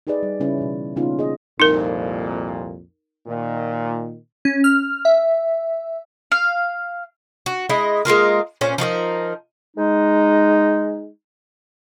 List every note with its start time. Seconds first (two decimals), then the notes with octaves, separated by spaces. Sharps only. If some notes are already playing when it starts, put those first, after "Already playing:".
0.07 D#4 G4 G#4 B4 D5 D#5
0.23 G3
0.40 C#3 G3 C#4 E4 B4
0.58 B2 E3
0.96 C#3 A#3 B3 C#4 D#4 F4
1.19 G#4 C5 D#5
1.60 C2 F2 A#2 D#4 A#4
3.27 A#2 D#3
4.45 C#4
4.64 F6
5.05 E5
6.32 F5
7.46 F#4
7.69 G#3 E4 D#5
8.05 G#3 A#3 F4 A#4
8.61 A#2 C#4 C5
8.78 F3 D#4 F#4 A#4
9.77 G#3 D#4